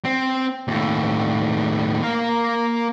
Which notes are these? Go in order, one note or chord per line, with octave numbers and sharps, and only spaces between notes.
C4
D#2 A2
A#3 F5